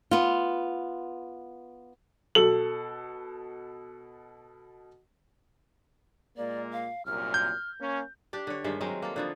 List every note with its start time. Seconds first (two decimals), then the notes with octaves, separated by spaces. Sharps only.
0.11 B3 F4
2.35 B2 A4 F#7
6.37 A#2 G#3 A#3 D5
6.72 F5
7.06 C2 F#2 A#2 F6
7.34 G6
7.79 A#3 C#4
8.33 D4 G4 D5
8.47 D3 C#5
8.64 G2 D#3 G#3 E5
8.81 F#3 G#3 C4 A#4
9.02 A#3 A4
9.16 D3 F3 B3